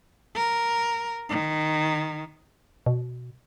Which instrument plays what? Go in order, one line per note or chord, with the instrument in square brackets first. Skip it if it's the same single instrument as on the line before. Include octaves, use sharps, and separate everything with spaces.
[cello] A#4
D#3
[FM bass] B2